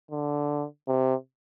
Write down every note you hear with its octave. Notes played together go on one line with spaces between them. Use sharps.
D3
C3